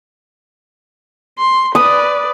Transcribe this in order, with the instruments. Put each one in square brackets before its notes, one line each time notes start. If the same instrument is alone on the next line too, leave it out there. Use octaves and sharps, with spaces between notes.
[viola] C6
[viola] B4 D5 [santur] D#6